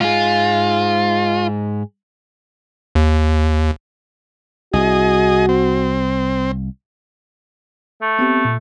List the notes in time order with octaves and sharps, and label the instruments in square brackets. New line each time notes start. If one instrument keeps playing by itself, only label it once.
[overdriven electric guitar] G#2 G#4 [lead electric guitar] F4
[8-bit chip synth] D#2
[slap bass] C2 [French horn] F#4 [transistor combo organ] G#4 D#5
[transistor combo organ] C4
[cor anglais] A3
[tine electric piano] B3 C4 G4
A#2